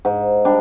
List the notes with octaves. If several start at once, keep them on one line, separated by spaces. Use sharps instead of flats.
G#2
G3 D4